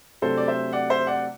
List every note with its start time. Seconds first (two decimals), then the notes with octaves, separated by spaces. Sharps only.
0.22 C3 F#3 A3 D4 A4 C5
0.37 D5
0.48 C5 E5
0.73 D5 F#5
0.90 C5 E5
1.07 D5 F#5